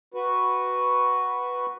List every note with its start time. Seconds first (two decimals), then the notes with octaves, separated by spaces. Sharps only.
0.14 F#4 B4